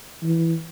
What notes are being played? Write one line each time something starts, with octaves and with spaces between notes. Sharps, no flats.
E3